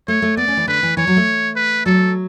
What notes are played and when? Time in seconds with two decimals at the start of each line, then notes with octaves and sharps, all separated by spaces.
0.08 A3 C#5
0.22 A3
0.37 B3 D5
0.48 C#4
0.57 E3
0.67 D3 B4
0.83 E3
0.97 E3 C#5
1.07 F#3
1.17 A3
1.56 B4
1.86 F#3 A4